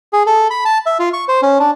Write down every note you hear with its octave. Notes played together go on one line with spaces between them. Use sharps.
G#4
A4
B5
A5
E5
F4
C#6
C5
C#4
D4